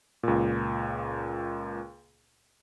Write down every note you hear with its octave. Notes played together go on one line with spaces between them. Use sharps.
C#2 A#2